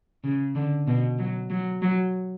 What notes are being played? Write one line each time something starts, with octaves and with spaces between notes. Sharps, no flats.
C#3
D3
B2
F#3
F#3
F#3